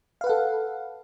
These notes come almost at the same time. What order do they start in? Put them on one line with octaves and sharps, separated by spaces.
F5 B4 F#5 A4